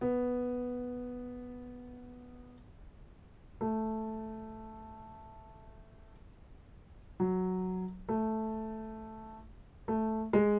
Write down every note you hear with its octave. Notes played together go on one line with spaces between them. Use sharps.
B3
A3
F#3
A3
A3
G#3